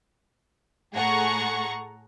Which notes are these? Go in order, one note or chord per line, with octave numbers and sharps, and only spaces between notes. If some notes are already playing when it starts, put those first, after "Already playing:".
A2 G#4 A4 F#5 A#5 C#6